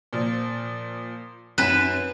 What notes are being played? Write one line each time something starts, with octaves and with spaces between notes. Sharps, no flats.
A#2 F3
F#2 B4 E7